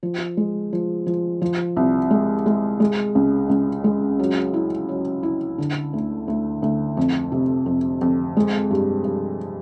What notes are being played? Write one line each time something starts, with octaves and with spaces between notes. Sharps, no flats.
F3
G#3
F3
F3
F3
C2
G#3
G#3
G#3
C#2
C#2
G#3
F#3
E4
F#3
E4
D3
D2
D2
D2
F2
C3
F2
F2
G#3
G2
G2